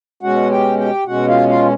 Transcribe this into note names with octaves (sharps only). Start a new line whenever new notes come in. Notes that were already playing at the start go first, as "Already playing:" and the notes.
B2 G#3 C#4 F#4 F#5
G4 G5
G4 G5
B2 G#3 C#4 F#4 F#5
F4 F5
F4 F5